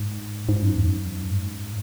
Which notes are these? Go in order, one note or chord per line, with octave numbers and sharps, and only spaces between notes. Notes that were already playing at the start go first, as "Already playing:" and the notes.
Already playing: G#2
G#2
F#2
E2
F#2
G#2